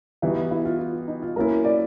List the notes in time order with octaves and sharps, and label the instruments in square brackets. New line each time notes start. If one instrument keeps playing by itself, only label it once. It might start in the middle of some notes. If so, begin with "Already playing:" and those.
[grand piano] E3 G3 B3 D#4 F#4 [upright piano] E4
[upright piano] E4
F4
F4
D#4
F4
[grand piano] F#3 A#3 C#4 E4 [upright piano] A#4
[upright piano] D5